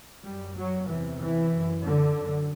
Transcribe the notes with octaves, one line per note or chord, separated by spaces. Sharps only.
F#2 G3
F#3
E2 C3 E3
E3
F#2
D3
F#2